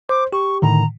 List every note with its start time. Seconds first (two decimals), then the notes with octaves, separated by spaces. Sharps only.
0.09 C5 D6
0.33 G4 C#6
0.62 A2 D3 D#3 A#5